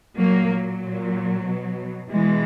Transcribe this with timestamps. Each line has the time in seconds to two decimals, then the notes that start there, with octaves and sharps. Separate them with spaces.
0.19 A#2 F#3 A#3
0.51 F#3
0.83 A#2
1.47 B2
2.11 B2 E3 G#3